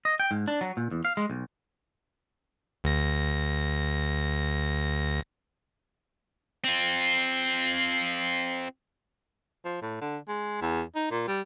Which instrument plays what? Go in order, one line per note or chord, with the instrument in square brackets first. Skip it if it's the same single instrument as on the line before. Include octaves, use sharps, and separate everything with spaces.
[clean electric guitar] D#5
G5
G#2
D4
F#3
A#2
E2
F5
G#3
B1
[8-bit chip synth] D2 A#6
[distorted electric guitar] C4 F4
[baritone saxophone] F3
A2
D3
G#3
E2
D#4
A#2
G3